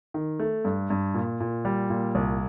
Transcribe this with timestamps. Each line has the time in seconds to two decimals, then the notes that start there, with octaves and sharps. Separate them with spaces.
0.14 D#3
0.39 A3
0.65 G2
0.90 G2
1.14 A#2
1.40 A#2
1.65 G3
1.90 A#2
2.15 C2